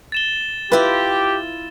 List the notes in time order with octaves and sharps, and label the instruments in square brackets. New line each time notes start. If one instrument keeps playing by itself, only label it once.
[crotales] A6 E7 G7
[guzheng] E4 F4 [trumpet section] G4 [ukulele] B4